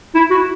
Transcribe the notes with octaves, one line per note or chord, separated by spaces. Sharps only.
E4
F#4